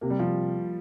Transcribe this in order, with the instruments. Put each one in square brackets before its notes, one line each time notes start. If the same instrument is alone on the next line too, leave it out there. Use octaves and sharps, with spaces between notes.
[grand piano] C3 [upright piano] A#3
[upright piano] G3
[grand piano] C3 [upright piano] F3